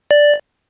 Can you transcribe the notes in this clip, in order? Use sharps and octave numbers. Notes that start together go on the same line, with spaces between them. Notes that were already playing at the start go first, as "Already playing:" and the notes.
D5